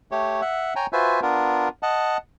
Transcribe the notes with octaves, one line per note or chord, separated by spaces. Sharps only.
A3 G4 C#5
E5 F#5
C#5 G5 G#5 A#5
F4 F#4 B4 C5 E5 G#5
B3 D4 F4 A#4
D#5 F#5 A5